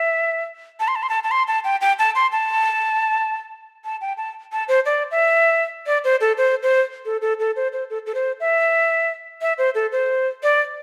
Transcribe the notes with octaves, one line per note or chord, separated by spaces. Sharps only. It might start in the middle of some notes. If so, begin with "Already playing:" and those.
Already playing: E5
A5
C6
A5
C6
A5
A5
C6
A5
G5
G5
A5
C6
A5
A5
G5
A5
A5
C5
D5
E5
D5
C5
A4
C5
C5
A4
A4
A4
C5
C5
A4
A4
C5
E5
E5
C5
A4
C5
D5